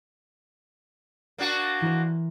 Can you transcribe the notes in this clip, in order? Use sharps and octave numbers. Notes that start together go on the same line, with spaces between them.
A#3 D4 F#4
E3 A#4 C5